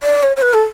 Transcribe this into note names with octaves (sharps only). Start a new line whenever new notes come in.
D5
C#5
C#5
B4
A4